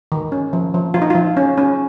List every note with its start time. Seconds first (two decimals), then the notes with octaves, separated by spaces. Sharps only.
0.12 D#3
0.32 C#4
0.53 F3
0.74 F3
0.94 F3 F4
1.02 D#4
1.10 F4
1.15 F3
1.37 C#4
1.58 C#4